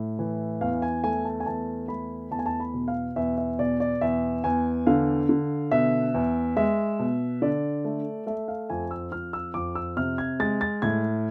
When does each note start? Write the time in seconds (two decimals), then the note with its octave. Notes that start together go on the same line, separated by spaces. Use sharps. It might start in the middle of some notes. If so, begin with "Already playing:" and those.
Already playing: A2
0.19 E3
0.61 E2 F5
0.82 G#5
1.04 A3 G#5
1.25 A5
1.40 G#5
1.46 E2 A5
1.88 A3 B5
2.31 E2 A5
2.39 G#5
2.46 A5
2.60 B5
2.74 B2
2.88 F5
3.16 E2 E5
3.38 E5
3.59 B2 D5
3.80 D5
4.01 E2 E5
4.44 E2 G#5
4.87 D3 F5
5.29 D3
5.71 B2 E5
6.14 E2
6.57 G#3 E5
6.99 B2
7.42 D3 D5
7.85 A3
8.27 A3 E5
8.48 F5
8.70 F2 G#5
8.91 E6
9.12 F2 F6
9.33 E6
9.54 F2 D6
9.75 E6
9.97 C3 F6
10.18 G#6
10.40 G#3 A6
10.61 A6
10.82 A2 G#6